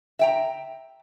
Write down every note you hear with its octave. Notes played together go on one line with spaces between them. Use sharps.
E5 G5 A#5